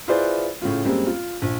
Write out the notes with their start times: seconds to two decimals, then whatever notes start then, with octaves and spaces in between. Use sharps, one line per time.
0.08 E4 F4 G#4 B4 C5 D5
0.62 A2 C#3 F4
0.84 F#2 G3 G#3 A#3 C4
1.06 F4
1.42 A#1